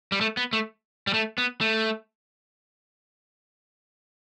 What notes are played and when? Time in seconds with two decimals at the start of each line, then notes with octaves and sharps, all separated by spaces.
0.12 G3
0.21 A3
0.37 B3
0.53 A3
1.07 G3
1.14 A3
1.38 B3
1.61 A3